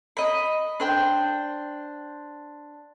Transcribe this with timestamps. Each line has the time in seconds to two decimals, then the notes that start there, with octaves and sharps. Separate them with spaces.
0.17 D#5 B5
0.80 D4 C5 G5